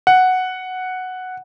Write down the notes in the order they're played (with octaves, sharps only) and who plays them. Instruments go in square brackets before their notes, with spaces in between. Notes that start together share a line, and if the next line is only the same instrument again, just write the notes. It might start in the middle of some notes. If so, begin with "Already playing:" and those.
[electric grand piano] F#5